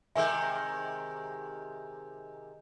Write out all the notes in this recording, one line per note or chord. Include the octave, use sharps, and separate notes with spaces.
C3 D#3 G#3 E5 G#5 E6 G6